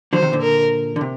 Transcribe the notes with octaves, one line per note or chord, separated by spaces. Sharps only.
D3 F#3 C5
C3 D#3
A#2 D3
A#4
D3
C3